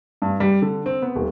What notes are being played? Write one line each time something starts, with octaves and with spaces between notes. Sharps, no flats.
G2
G3
D3
C4
B3
D#1